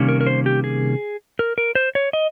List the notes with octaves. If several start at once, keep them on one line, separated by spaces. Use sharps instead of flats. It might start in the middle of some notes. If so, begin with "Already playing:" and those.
Already playing: C3 D#3 G3 A#3 C#4
A#4
A#4
C5
G4
G#4
A#4
A#4
C5
C#5
D#5